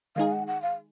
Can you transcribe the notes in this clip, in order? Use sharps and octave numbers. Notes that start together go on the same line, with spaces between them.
D#3 G#3 D#4 G#4 F5
F#5
F#5
F5